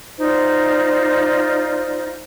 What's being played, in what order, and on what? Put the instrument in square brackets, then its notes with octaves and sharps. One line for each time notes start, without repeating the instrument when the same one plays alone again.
[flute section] D#4 F4 C5 D5